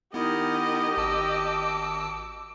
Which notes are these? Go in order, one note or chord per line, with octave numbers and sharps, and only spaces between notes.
D#3 B3 E4 G4 D#5
G#1 A5 D6 E6